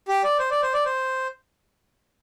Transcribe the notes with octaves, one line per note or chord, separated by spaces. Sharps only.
G4
D5
C5
D5
C5
D5
C5